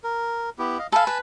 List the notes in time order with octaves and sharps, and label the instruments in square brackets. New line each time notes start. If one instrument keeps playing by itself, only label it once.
[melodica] A#4
B3 E4 G4
D#5 F5
[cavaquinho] A4 F5 [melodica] G#5 A5 B5
[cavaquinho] B4